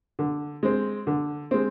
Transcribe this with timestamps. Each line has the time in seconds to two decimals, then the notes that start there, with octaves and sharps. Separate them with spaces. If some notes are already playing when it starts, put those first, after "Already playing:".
0.19 D3
0.63 G#3 C4
1.07 D3
1.51 G#3 C4